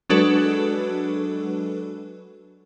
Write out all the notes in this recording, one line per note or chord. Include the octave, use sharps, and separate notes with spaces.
F#3 G#3 D4 F#4 A4 B4